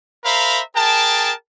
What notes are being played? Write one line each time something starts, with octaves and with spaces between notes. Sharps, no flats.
A#4 C5 E5 F5 A#5 B5
G#4 A#4 G5 A5